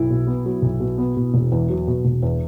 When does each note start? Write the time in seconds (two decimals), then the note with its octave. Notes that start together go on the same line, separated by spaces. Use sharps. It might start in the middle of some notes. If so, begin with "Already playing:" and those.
Already playing: B1 E4
0.10 B2
0.27 B3
0.46 F#3
0.62 B1
0.80 B2
0.98 B3
1.16 B2
1.34 E1
1.52 E2
1.70 F#3
1.87 B2
2.05 E1
2.23 E2